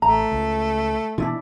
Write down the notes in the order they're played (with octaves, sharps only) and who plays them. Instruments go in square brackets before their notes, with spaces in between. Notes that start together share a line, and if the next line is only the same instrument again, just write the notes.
[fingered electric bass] A1 [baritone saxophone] A3 [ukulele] A#5
[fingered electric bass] C#2
[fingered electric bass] B2 E3 [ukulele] D4 E4 F4